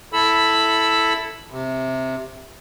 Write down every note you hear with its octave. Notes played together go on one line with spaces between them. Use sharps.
E4 A4 B5 E6
C3